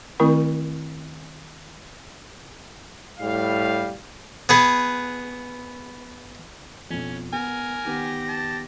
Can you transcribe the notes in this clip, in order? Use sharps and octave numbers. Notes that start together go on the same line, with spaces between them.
D#3 A3 C4 E4 A#4 C#6
A2 G3 F5
B3 G#4 B4
F2 B2 C#4
B3 A#4 G#5
D#3 B3 G4 A#6
A5